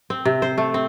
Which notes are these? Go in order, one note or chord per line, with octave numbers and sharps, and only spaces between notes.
C4
C3
C5
A3
C4